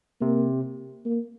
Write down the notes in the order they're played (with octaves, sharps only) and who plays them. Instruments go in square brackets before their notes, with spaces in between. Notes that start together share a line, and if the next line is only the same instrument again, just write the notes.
[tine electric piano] C3 [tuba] A#3
[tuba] A#3